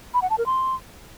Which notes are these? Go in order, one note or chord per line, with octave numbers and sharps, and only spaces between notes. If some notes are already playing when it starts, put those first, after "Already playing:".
B5
F#5
A5
A#4
C6